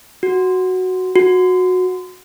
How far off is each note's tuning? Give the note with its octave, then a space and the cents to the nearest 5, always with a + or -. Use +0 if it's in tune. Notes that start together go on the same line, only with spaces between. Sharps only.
F#4 +0
F#4 -15